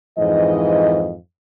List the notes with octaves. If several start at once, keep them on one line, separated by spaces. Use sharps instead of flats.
F2 G#2 E3 D#5